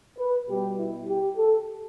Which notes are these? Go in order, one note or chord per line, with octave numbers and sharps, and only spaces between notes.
B4
B2 G3 B3 G4
E4
G4
A4